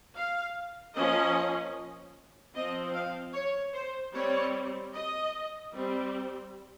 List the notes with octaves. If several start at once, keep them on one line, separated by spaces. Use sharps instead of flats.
F5
F3 A#3 C#4 D#5
F3 C4 D#5
F5
C#5
C5
G3 C4 C#5
D#5
G3 C4